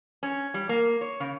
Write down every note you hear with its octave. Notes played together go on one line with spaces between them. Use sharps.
C#4
G3
A#3
C#5
C#3